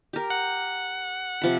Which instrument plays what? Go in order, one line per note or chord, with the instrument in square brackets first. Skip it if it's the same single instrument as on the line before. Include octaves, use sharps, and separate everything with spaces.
[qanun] G4 A#4
[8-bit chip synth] F#5
[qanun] C3 F3 B5